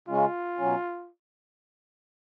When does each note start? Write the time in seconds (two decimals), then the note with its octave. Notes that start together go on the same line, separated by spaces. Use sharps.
0.08 C#3 G#3 C#4 F4
0.58 B2 F#3 C#4